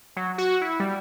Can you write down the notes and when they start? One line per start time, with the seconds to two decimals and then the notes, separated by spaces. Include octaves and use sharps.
0.16 F#3
0.38 F#4
0.61 E4
0.80 G3